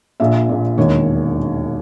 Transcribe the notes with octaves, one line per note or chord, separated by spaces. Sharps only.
A#1 A#2 E5
A#1 A#2
E1 D#2 D#3 C#5